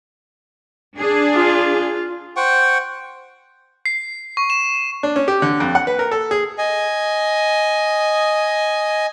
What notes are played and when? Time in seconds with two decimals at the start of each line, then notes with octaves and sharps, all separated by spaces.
0.96 D4 G#4
1.34 F4
2.37 C5 F#5 G5 C#6
3.86 C7
4.37 C#6
4.50 E7
5.03 D4
5.16 C#4
5.28 G4
5.42 D3
5.60 F2
5.75 F#5
5.87 B4
5.99 A#4
6.12 A4
6.31 G#4
6.58 D#5 G#5